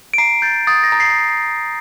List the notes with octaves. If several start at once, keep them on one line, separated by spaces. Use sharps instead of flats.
D7
A#5 C7
G6 A6
D#6 A6
A#6
A#5
C7